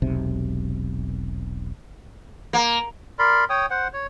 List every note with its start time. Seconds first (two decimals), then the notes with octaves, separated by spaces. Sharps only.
0.02 E1 B1 C3
2.53 A#3
3.19 A#4 D5 B5 C6
3.50 C#5 G5 D#6
3.70 C5 F#5
3.93 C#5